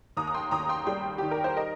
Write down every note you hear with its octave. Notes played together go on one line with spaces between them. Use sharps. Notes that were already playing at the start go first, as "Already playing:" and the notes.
D#2 A#5 D#6
D#6
G5 C6
D#2 A#5 D#6
G5 C6
G3 G5 C6
D#3 G4
A#4
C5
A#4 D#5